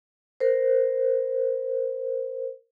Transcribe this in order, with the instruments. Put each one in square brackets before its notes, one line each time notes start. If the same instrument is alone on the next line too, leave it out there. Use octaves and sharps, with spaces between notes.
[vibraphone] A#4 C5